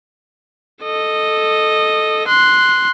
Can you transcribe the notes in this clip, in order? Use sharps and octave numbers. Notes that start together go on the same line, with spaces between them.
A4 D#5
C6 F#6